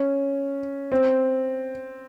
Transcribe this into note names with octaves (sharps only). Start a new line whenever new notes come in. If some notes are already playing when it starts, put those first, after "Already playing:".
Already playing: C#4
C4